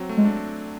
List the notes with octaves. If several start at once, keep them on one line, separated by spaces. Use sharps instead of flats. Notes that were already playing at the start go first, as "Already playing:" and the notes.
Already playing: F#3 C4
A3
G#3
D4